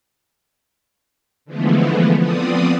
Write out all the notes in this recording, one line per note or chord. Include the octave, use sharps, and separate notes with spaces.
D3 E3 F3 G#3 A3 B3
F3 B3 C4 D5 D#6